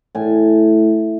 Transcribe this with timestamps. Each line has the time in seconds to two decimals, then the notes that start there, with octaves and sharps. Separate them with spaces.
0.15 A2 G#5